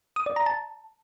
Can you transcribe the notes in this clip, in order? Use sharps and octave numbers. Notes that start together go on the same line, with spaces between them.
D#6
D5
A#5
A5